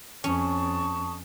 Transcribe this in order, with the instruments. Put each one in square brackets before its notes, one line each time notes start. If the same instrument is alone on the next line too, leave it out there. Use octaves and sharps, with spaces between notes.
[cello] F2 [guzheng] C#4 [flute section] A5 C#6 D#6